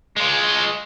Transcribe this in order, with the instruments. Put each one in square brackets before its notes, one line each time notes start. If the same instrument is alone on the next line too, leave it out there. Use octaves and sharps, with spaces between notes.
[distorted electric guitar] G#3 F4